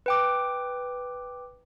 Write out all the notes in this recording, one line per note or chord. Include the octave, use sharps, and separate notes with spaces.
B4 G5 D6